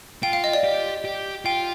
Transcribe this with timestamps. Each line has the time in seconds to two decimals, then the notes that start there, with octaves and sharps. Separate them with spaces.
0.23 F4 G5
0.33 F5
0.44 D#5
0.53 D5
0.64 G4
1.05 G4
1.45 F4 G5